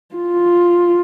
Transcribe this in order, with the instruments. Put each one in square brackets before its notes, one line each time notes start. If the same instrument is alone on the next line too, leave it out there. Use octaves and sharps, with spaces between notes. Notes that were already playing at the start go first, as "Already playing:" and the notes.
[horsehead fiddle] F4